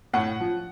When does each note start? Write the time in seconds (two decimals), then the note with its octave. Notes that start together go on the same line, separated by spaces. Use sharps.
0.13 A2 F#5
0.40 F3